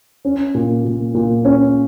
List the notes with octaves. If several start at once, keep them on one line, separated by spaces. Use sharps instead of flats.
C#4
A#2
A#2
A#2
C#4